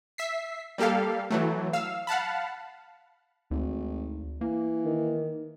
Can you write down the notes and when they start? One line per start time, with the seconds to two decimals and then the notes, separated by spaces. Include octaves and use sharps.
0.18 E5 B6 C7
0.78 G3 A#3 G4 A4 F5
1.30 E3 F#3 A3
1.73 F5 E6
2.07 F5 F#5 A5 B5
3.51 G#1 D2
4.41 E3 A#3
4.85 D#3